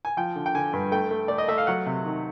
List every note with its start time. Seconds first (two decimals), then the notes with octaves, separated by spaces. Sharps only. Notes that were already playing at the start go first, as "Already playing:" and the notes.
0.05 G#5
0.17 F3 G5
0.36 D3
0.46 G5
0.55 D3 G#5
0.73 G2
0.92 A3 G5
1.11 A3
1.28 A3 D5
1.38 D#5
1.48 A3 E5
1.58 F5
1.67 F#3 F#5
1.86 C3
2.05 D#3